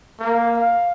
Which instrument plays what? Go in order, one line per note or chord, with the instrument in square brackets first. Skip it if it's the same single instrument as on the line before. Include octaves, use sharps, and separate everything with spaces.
[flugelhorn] A#3
F5